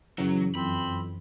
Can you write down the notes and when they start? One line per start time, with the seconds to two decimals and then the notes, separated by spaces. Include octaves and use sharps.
0.18 F#2 C#3 E3 F#3
0.55 F2 C4 B5